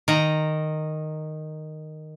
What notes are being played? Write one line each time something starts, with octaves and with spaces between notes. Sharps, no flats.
D#3 A#5